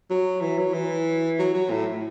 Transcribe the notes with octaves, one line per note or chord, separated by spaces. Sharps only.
F#3
E3
F#3
E3
F#3
F#3
A2